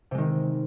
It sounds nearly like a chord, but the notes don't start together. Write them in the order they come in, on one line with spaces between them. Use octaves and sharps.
C3 G#3 D#3